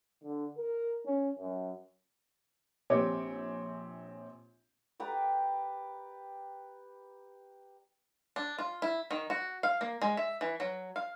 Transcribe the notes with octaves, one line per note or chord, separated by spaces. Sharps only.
D3
A#4
C#4
F#2
A#1 C4 G4 C#5 D6
G4 B4 D5 A#5
D4
F4
E4
D#3
F#4
F5
A#3
G#3
E5
E3
F#3
F5